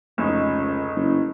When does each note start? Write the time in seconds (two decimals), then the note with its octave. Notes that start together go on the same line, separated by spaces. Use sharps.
0.18 F1 C#2 D#4
0.95 F#1